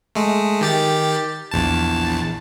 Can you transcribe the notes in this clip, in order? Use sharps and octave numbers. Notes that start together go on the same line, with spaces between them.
G#3 A3
D#3 G4 A6
A#1 E2 A5